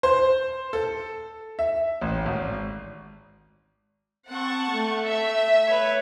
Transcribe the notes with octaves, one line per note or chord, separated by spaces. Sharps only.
C5
A4
E5
A1
G#1
C4 F#5 A5 C#6
A3
E5
B4 C#5